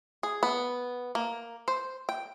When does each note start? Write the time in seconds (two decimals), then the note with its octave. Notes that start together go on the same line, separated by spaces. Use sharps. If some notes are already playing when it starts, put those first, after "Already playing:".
0.23 G#4
0.43 B3
1.15 A#3
1.68 C5
2.09 G5